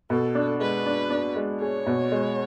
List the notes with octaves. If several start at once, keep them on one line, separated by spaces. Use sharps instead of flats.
B2 A4
D4
G#3 B4
D4
D4
G#3
G#4 C#5
B2
G#3